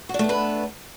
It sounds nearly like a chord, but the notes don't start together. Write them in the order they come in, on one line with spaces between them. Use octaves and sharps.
F#4 D4 A3 B3 B4